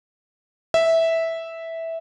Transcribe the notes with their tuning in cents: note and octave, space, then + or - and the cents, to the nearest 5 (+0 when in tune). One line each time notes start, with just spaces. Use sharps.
E5 -10